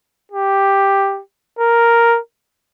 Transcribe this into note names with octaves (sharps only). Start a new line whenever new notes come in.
G4
A#4